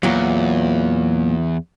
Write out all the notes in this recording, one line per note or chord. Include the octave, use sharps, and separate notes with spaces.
E2 A#2 F#3